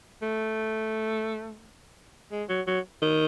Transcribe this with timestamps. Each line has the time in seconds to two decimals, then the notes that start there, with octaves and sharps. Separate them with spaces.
0.22 A3
2.31 G#3
2.49 F#3
2.67 F#3
3.02 D#3